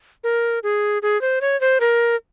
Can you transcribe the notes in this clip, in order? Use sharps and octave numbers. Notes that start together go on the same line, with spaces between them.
A#4
G#4
G#4
C5
C#5
C5
A#4